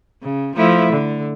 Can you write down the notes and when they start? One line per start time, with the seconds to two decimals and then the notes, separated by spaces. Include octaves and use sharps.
0.23 C#3
0.56 F3 A3 E4
0.93 D3